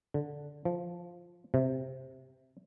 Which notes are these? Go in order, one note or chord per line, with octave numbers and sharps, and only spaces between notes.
D3
F3
C3